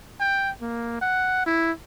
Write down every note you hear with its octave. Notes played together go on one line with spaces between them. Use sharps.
G5
A#3
F#5
E4